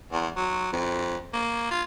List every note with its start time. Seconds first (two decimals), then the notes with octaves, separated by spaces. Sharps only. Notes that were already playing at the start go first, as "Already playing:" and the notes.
0.12 E2
0.36 F#3
0.73 F2
1.33 A#3
1.71 F4